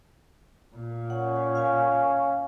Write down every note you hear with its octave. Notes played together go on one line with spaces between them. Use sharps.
A#2
C#4 F#5
F5 G#5